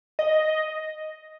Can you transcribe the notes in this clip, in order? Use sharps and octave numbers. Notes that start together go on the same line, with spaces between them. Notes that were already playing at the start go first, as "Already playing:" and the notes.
D#5